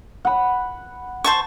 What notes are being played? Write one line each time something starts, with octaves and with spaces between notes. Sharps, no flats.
F#5 B5
C5 A5 C#6